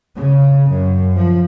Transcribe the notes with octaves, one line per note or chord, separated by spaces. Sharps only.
C#3
F#2
F3